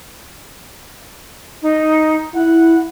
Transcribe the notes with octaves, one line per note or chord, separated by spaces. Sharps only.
D#4
E4 F#5